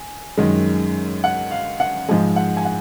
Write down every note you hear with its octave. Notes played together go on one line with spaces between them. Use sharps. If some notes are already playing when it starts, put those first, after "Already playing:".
Already playing: G#5
F#2 D#3 G#3
F#5
F5
F#5
G#2 F3 G#3 G#5
F#5
G#5
F#5